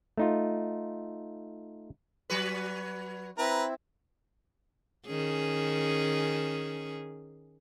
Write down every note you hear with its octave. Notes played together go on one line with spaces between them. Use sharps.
A3 D#4 F4
F#3 F#4 B4
C4 E4 B4 A#5
D#3 C#4 G#4